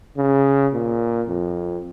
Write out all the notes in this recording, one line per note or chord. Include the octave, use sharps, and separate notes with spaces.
C#3
A#2
F2